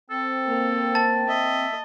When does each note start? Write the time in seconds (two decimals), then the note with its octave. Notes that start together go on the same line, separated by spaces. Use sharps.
0.10 C4 A4
0.46 A#3
0.95 A5 A6
1.28 D#5 E5